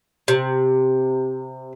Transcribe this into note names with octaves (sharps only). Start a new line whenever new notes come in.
C3